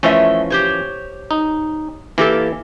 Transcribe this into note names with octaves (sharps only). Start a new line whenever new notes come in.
E3 F3 A3 C#4 D#5 E5
G4 C5 C#5
D#4
E3 A#3 G4 A4